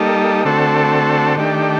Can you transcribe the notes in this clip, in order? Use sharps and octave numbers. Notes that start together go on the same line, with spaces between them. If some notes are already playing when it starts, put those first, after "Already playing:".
Already playing: G3 A#3 D#4 A4
D3 A3 C4 F#4 A4
D#3 A3 D4 G4